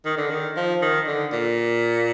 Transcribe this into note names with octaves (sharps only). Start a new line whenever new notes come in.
D#3
D3
D#3
F3
D#3
D3
A#2